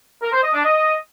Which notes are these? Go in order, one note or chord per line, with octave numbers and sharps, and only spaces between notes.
A#4
C5
D#5
D4
D#5